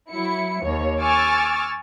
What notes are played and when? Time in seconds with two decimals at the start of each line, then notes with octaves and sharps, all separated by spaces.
0.11 F#3 E4 C#7
0.64 D#2 C#5
0.99 G#5 C#6 D6 E6 F6 A6